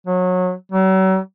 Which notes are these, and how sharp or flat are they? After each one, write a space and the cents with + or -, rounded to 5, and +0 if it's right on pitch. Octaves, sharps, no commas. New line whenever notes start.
F#3 -25
F#3 +40